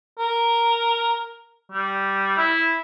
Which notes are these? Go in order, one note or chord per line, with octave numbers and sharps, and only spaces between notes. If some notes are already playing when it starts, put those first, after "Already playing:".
A#4
G3
E4